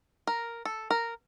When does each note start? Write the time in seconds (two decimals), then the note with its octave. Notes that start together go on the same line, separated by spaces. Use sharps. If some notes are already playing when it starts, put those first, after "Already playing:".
0.27 A#4
0.65 A4
0.91 A#4